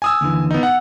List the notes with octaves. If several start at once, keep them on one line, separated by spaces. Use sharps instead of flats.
G#5 D#6 E6
D#2 D3 E3
B3 D#4
F#5